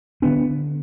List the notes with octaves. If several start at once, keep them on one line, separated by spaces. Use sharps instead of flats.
D3 B3 D4